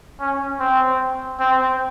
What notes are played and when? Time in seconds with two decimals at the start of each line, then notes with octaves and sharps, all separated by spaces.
0.20 C#4
0.60 C4
1.40 C4